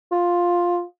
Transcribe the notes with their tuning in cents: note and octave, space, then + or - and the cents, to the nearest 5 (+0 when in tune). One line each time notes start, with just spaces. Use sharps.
F4 +5